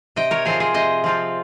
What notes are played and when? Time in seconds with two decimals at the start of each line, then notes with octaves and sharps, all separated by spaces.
0.16 C3 D#5 G5
0.31 A#4 C#5
0.45 F3 C4 F4 G#4 C5
0.60 G#4 C5
0.74 C3 C5 D#5
1.04 F3 C4 F4